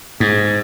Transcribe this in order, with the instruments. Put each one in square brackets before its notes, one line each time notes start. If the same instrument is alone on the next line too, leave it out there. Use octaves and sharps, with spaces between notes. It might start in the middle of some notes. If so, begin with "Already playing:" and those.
[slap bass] G#2